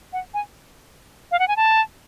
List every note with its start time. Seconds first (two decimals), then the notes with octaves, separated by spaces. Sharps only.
0.13 F#5
0.34 G#5
1.31 F5
1.39 F#5
1.48 G#5
1.56 A5